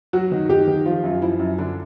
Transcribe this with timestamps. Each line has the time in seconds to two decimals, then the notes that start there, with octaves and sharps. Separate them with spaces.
0.13 F#3 F#4
0.32 D#3
0.49 D#3 G4
0.68 D#3
0.86 F3 F4
1.04 F#2
1.22 F3 E4
1.39 F#2
1.58 D3 D4